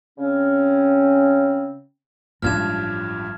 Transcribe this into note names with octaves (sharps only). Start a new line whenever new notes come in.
C#3 C4 C#4
A1 G2 F3 G#3 F6 G#6 E7